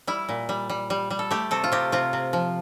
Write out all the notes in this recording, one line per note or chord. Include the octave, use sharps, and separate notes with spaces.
G3 E4
A#2
G3
G3
G3
G3
A4
A3 G4
C3 A4
F4
C3 G4
C3 F4
C3
F3